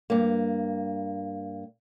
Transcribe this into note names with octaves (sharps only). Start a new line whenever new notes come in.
G2 A#3